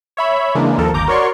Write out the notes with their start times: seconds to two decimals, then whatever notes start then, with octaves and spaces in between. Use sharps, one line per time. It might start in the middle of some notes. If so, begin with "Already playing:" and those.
0.17 C#5 E5 B5
0.55 C#3 E3 G#3 A#3 D4
0.78 D#2 F3 A4 A#4
0.93 G1 D#2 A#5 D6 G6
1.07 F#4 A#4 C#5 D5 C6 C#6